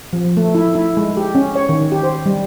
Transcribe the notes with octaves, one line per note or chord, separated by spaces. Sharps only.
F3
A3
E4
E4
G#3
G4
C#4
C#5
D#3
G4
C5
G3